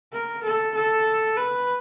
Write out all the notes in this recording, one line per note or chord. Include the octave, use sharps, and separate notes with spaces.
A#4
A4
A4
B4